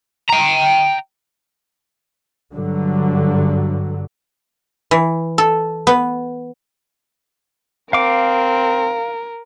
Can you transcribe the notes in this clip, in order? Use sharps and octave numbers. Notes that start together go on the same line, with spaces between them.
G5 A#5
G2 D3 F#3
E3
A4
B3
C4 A#4 F5 D6